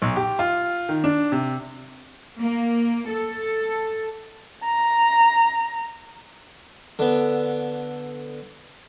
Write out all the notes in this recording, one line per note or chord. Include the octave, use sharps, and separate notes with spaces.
B1
G4
F4
D#3
D4
C3
A#3
A4
A#5
D3 B3